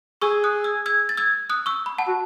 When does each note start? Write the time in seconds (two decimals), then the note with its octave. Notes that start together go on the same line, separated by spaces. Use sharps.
0.22 G#4 C#6 E6
0.44 D#6 F#6
0.64 E6 G#6
0.86 E6 G#6
1.09 A6
1.17 E6 G#6
1.50 D#6 F#6
1.66 C#6 E6
1.86 B5
1.98 F#5 A5
2.08 F#4